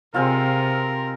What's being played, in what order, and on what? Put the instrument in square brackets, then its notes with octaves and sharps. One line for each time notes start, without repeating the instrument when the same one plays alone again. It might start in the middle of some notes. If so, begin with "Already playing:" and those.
[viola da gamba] C3 [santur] G#3 C4 F4 [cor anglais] A#4